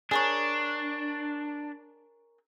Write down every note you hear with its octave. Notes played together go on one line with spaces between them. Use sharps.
D4 G#4 A#4 C#5